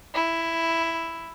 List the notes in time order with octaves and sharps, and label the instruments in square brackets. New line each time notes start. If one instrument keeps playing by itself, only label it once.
[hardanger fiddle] E4